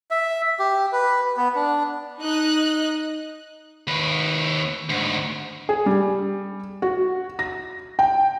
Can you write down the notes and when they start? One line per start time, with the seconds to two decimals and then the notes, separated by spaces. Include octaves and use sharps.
0.11 E5
0.59 G4
0.92 B4
1.37 B3
1.56 D4
2.19 D#4 D#5 F#6
3.87 D#2 B4
4.90 D2 G#2
5.69 G#4
5.86 G3
6.82 F#4
7.39 A#6
7.99 G5